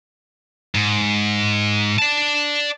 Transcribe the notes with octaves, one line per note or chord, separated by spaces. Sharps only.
G#2
D5 A5